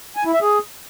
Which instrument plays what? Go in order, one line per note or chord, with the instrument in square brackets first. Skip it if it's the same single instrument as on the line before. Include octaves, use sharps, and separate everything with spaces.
[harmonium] G#5
E4
E5
G#4